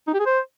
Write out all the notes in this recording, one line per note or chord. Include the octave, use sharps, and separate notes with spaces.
D#4
G4
G#4
C5